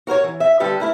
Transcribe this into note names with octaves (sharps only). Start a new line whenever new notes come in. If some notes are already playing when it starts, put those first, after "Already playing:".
F#4 A#4 C5 C#5
E3
E5
D3 G3 G4 A4 B4
A3 E4 A#4